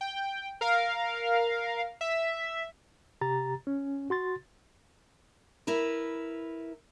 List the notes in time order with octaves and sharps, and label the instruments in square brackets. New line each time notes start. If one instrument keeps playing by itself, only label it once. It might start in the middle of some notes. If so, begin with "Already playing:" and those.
[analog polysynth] G5
A#4 F5
E5
[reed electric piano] C3 G4 A#5 A6
C#4
F#4 C6 A6
[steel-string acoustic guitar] E4 A#4 B4